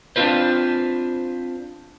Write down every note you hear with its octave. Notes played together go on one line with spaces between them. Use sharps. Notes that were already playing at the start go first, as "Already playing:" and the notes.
C4 D4 F4 B4 C5